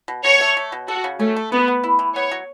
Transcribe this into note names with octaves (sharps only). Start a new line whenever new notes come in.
B2
B2 C#5
A3
A3
B2
F#4 A4
C#3
A3 C#4
A3
B3 B4
B3
E4
E3
B3 C#5
F#3